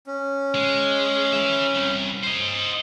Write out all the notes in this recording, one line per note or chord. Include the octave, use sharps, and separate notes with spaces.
C#4
G#3
B4 E5
C2
C5 D#5